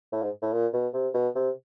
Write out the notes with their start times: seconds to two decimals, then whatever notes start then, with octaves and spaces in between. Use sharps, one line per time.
0.12 A2
0.22 G#2
0.42 A2
0.53 A#2
0.73 B2
0.94 C3
1.14 B2
1.35 C3